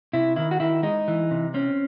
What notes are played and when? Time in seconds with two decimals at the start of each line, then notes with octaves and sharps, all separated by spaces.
0.13 C3 E4
0.36 D#3 E4
0.51 F#4
0.60 D#3 E4
0.83 G#3 D#4
1.08 E3
1.31 C3
1.54 C4 C#4